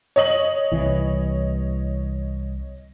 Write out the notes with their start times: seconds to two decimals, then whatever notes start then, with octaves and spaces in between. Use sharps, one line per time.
0.16 C#5 D#5 F#7
0.72 C2 E3